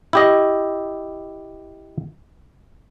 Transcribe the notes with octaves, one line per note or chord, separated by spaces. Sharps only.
E4 G4 D#5